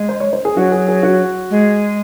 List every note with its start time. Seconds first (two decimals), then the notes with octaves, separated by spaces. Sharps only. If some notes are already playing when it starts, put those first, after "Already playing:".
Already playing: G#3
0.09 C5
0.20 C#5
0.33 C5
0.45 G#4
0.56 F#3 F#4
0.72 G#4
0.88 G#4
1.03 F#4
1.50 G#3